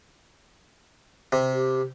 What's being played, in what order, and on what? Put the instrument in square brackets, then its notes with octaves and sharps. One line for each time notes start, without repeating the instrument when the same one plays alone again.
[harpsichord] C3
[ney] G4